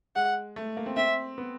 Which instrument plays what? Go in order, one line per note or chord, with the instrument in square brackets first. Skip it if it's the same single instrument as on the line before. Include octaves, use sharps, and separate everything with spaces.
[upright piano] G#3 [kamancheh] F#5
[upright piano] A3
A#3
C4
[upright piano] C4 [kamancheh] E5
[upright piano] B3